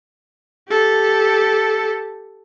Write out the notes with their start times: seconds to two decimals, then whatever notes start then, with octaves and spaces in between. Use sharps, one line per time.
0.69 G4 A4